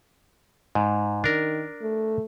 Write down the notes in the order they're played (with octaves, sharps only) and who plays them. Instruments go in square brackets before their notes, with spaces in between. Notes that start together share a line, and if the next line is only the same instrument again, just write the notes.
[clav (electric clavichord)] G#2
[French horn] D#3 [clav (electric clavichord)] D4 A#4
[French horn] A3